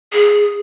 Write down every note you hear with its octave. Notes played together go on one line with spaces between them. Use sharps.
G#4